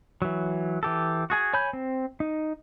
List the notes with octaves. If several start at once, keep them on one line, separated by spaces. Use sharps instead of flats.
E3 F#3
E3 G4 A4
F#4 G#4 G#5
C#5 G#5 B5 G6
C4
D#4